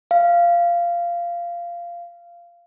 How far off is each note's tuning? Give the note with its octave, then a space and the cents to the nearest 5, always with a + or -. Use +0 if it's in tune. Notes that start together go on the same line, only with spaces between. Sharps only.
F5 -15